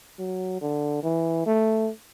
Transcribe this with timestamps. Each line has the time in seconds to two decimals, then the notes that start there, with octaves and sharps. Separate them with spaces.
0.19 F#3
0.61 D3
1.03 E3
1.46 A3